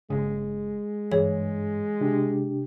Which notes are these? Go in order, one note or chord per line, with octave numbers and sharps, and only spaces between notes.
G1 C#3 G#3
G2 E3 G#4 C#5
C3 D4 G4